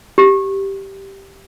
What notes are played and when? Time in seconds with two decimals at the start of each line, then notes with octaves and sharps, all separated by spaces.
0.18 G4